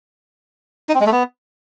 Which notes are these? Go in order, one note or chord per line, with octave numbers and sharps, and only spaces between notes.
D#4
C4
G#3
A3
B3